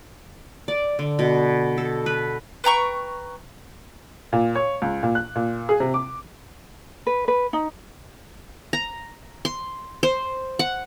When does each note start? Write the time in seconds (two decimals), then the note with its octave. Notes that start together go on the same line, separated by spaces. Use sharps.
0.68 D5
0.99 D3
1.19 B2
1.78 A4
2.06 B4
2.64 B4 G5 A#5 C#6
4.33 A#2
4.55 C#5
4.82 C#2
5.03 A#2
5.15 F#6
5.35 A#2
5.69 G#4
5.80 C3
5.94 D6
7.07 B4
7.28 B4
7.53 D#4
8.73 A#5
9.45 C6
10.03 C5
10.59 F#5